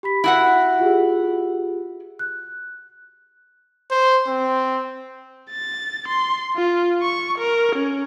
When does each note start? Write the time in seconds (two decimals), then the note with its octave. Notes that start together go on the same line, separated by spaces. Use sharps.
0.03 G4 B5 B6
0.24 E4 F#4 F#5 F#7
0.80 F4 G4 G#4
2.19 F#6
3.91 C5
4.27 C4
5.51 A6
6.08 C6
6.57 F4
7.02 C#6
7.39 A#4
7.76 C#4